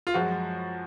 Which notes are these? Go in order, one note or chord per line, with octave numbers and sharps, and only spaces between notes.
F4
F#2 F3 G#3 F#4